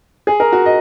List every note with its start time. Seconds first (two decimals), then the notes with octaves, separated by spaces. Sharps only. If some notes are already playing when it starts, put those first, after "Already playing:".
0.27 G#4
0.40 A#4
0.52 F#4
0.66 D#5